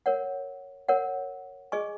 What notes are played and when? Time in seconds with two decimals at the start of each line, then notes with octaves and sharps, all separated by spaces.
0.06 A#4 C#5 F#5
0.88 A#4 C#5 F#5
1.72 G#4 D#5 G#5 C#6